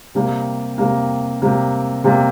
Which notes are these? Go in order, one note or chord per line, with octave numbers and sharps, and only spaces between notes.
C3 G3 A#3
C3 G3 A#3
C3 G3 A#3
C3 G3 A#3